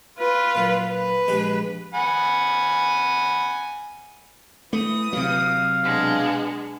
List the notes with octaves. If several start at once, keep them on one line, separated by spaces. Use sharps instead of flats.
F4 B4
A#2 F#3
B4
A#1 G#3 G4
F#5 G#5 B5
E3 A3 D#6
C3 F#3 F5
B2 G#3 D4